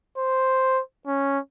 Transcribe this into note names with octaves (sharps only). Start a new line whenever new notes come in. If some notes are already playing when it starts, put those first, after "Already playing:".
C5
C#4